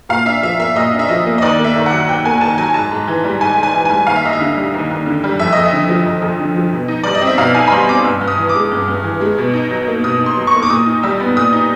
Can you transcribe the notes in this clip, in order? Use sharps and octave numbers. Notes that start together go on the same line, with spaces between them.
A#2 F5
D4 E5
F3 E5
A#3 E5
A#2 D#5
D4
E5
F3 D#5
A#3
D#5
D#2 D5
A#3
E5
D#3
F#5
F#3
D#2 G5
A#3 G#5
D#3 A5
F#3 G#5
G#2 A5
G#2
E3
G3
G#2 G#5
G#2
G#5
E3
G3 G#5
D#2 F5
E5
D#2 D#5
E5
D3
G3
D#2
D#2
D3
G3
F2 E5
F2 D#5
E5
D3
F3
F2
F2
D3
F3
B2
D#4
G3 D5
D#5
C4
E5
B2 F5
D#4 G#5
B5
G3 C6
C4 D6
G2 E6
G2
D#6
E3
D6
G#3
G2
G2
E3
G#3
B2
D#4
F#3
A#3
B2 D#6
D#4
C6
F#3
C#6
A#3
D6
A#2 D#6
D#4
G3 E6
B3
A#2 D#6
D#4